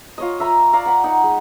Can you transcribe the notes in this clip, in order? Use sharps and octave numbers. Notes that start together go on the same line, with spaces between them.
F4 C#5 D#5
E5 A#5 B5
D5 F5 A#5
F#5 B5
D#4 F#5
G#3